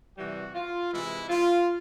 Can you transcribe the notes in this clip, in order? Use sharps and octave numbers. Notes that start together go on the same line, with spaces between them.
C3 E3 G3 F#4
F4
C3 E3 G#3 E4
F4